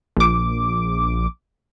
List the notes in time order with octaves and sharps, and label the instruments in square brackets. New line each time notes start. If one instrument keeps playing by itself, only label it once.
[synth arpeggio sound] A#1 D6